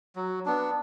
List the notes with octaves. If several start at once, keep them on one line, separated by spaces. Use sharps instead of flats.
F#3
B3 D4